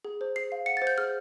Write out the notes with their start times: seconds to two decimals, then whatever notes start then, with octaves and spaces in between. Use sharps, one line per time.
0.05 G#4
0.21 C5
0.36 G#4 C7
0.52 F5
0.66 F#5 C#7
0.77 A6
0.82 C5
0.87 G6
0.98 G#4 F6